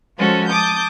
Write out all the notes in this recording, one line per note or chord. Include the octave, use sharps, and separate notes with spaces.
F3 G#3 C#4 F#4 A4 C5
A5 D6 D#6 G6